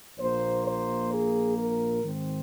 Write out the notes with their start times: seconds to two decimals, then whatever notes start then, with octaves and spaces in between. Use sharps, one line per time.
0.19 A#1 A#2 A#3 C5
0.66 C5
1.12 G#4
1.57 A#4
2.03 G#2 D#3 C4